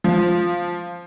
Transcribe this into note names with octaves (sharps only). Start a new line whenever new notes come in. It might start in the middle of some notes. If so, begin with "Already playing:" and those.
F3